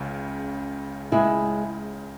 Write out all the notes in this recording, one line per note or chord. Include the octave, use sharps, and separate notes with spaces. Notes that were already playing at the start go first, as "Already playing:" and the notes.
Already playing: C#2 C#3
C#2 C#3 G#3 E4 G#4